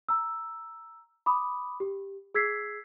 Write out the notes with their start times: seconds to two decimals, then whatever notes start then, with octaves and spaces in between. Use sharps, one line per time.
0.09 A#5 E6
1.26 B5 D6 D#6
1.80 G4
2.35 G#4 E6 G#6 B6 C7